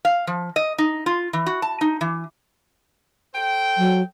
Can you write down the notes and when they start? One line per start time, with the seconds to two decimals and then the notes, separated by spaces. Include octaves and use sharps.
0.05 F5
0.27 F3
0.56 D#5
0.78 D#4
1.06 F4
1.33 E3
1.46 F#4
1.62 A5
1.81 D#4
2.01 E3
3.34 A4 C5 G5
3.78 F#3